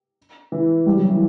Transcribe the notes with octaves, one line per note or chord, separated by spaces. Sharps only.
E3
G3
F#3
E3